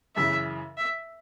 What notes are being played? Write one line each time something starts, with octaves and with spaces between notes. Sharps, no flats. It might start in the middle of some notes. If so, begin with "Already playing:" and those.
F#2 C#3 E3 E5
E5